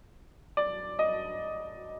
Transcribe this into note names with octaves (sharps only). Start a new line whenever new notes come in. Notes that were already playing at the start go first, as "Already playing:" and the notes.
D5
D#5